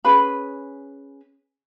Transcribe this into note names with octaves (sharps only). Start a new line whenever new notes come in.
C#4 G#4 B4 B5